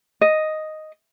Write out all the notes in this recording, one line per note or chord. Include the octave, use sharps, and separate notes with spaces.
D#5